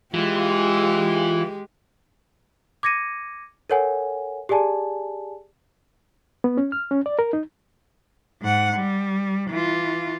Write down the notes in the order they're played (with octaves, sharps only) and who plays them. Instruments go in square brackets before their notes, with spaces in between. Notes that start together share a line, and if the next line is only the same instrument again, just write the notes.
[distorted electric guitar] E3 [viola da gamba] G#3 G4 [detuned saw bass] F4
[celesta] D6 G#6 A#6 C#7 D#7
A4 A#4 C#5 F#5 G#5
G4 G#4 D5 G#5 A5
[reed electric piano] B3
C#4
F6
C#4
D5
A#4
D#4
[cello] G#2 F#5
G3
E3 F4